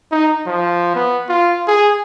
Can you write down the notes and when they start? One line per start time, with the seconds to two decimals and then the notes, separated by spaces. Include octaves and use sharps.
0.12 D#4
0.47 F3
0.95 B3
1.29 F4
1.67 G#4